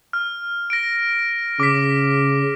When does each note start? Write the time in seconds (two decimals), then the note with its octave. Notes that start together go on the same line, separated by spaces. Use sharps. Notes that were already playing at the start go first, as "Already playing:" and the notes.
0.13 F6
0.70 A#6 D7
1.60 C#3 D6 B6